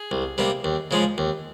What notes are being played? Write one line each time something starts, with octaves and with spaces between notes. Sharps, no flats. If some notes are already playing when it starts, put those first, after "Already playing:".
Already playing: G#4
C2
C3 G3 A#3
D#2
C#3 F3 G#3
D#2